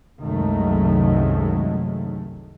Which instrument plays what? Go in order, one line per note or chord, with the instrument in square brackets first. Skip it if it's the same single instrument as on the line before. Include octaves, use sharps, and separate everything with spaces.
[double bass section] C2 F#2 D#3 F#3 G#3 A3